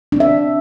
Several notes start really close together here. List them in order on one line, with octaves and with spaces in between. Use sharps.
D4 C4 E5